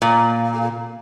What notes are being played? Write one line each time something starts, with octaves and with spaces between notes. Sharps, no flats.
A#2